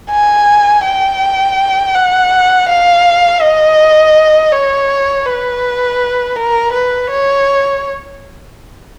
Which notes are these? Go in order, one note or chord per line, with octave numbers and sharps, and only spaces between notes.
G#5
G5
F#5
F5
D#5
C#5
B4
A#4
B4
C#5